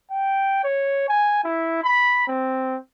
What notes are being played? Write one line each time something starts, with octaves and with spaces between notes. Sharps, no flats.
G5
C#5
G#5
E4
B5
C4